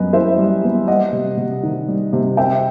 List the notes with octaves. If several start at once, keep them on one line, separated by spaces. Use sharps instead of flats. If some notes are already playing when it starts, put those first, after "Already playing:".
Already playing: F#2 G3 B3 B4 D#5
E3 C5 E5
G3
B3
G3 D#5 F#5
C3
C3
D#3
G3
C3
C4 E5 G5